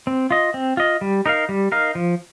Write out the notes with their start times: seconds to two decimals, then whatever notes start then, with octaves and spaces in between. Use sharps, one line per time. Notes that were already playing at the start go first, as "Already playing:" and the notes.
0.07 C4
0.31 F4 D#5
0.54 C4
0.77 F4 D#5
1.01 G3
1.26 D#4 A#4 F5
1.49 G3
1.72 D#4 A#4 F5
1.95 F3